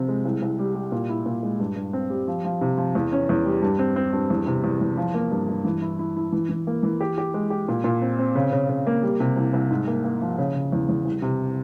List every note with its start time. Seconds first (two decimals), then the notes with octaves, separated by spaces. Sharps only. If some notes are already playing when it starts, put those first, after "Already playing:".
Already playing: C3 F3 C4
0.08 G#3
0.25 C2
0.42 C2
0.59 G3
0.75 G3
0.92 A#2
1.09 E4
1.26 A#2
1.43 G#3
1.60 G2
1.76 G2
1.93 C4
2.10 G3
2.27 F3
2.45 F3
2.61 C3
2.78 F3
2.95 E2
3.12 C#4
3.29 E2
3.46 G3
3.62 G2
3.79 C4
3.96 C4
4.13 G2
4.30 E2
4.47 C3
4.64 E2
4.81 E2
4.97 F3
5.14 A#3
5.32 G2
5.49 G2
5.65 E3
5.82 E4
5.99 E4
6.16 E4
6.32 E3
6.49 E3
6.67 A#3
6.83 E3
7.00 G4
7.18 G4
7.34 G#3
7.50 G4
7.68 A#2
7.84 A#2
8.01 C4
8.19 C4
8.35 C#3
8.52 C#3
8.69 C#3
8.87 A#3
9.03 G3
9.20 C3
9.37 C2
9.53 C2
9.70 G#2
9.87 A#3
10.04 A#3
10.21 F3
10.38 C#3
10.55 C#3
10.72 E2
10.89 E2
11.05 C2
11.22 C3